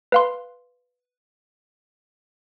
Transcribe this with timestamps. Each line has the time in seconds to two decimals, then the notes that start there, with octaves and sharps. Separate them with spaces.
0.12 B4 F5 C6